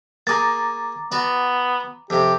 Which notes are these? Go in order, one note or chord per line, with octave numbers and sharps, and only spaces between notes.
A#3 G#4 A#5 D6 A6
B3 F#4 D5
F2 C3 G4